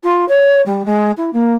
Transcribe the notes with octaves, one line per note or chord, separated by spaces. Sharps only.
F4
C#5
G3
G#3
E4
A#3